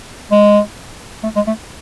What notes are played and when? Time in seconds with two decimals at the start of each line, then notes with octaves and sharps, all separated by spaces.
0.32 G#3
1.23 A3
1.36 G#3
1.47 A3